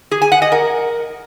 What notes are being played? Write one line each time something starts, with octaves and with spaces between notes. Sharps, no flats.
G#4
G#5
F#5
D#5
A#4